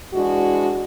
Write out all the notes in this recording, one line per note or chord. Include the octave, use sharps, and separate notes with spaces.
E3 G#3 D4 F#4